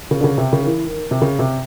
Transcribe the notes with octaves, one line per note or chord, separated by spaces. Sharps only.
C#3
D3
C#3
C3
C#3
D#3
E3
D#3
C3
C#3
C3